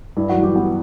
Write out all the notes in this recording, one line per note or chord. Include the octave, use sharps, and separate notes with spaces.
G2 E4
F#3 F#4
E3
G3 G4
G3 B3 G4